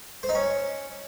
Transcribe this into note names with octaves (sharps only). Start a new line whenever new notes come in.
C5
D#4
C#4